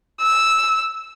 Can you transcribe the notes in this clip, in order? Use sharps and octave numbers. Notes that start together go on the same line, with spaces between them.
E6